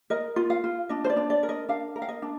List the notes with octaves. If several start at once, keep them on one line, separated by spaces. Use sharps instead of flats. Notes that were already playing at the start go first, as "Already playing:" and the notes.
A#4 D#5
F4
F5
F4
D4 D#5
C5
D5
D4
D5
A#4
D#5
D4 F5
A#4
F5
D#5
D4